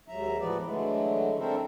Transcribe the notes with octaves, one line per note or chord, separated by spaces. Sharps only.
D#2 G#2 F#3 E5 A#5
A2 E3 F3 B3 B4 D5
D3 E3 F#3 G#3 A3
C4 D4 E4 A4 A#4 C5